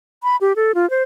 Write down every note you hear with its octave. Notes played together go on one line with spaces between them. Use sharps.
B5
G4
A4
F4
C5